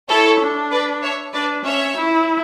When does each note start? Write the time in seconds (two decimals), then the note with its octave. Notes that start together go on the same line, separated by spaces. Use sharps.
0.09 E4 A4 C#5
0.40 D4
0.71 B4 D5
1.02 C#5 E5
1.33 D4 B4 D5
1.64 C#4 C#5 E5
1.96 E4